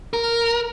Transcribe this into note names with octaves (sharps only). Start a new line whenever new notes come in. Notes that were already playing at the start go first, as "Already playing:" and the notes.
A#4